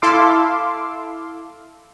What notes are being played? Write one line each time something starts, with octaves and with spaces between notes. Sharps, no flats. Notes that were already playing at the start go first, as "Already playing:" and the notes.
E4 A4 F5 C6 D6 E6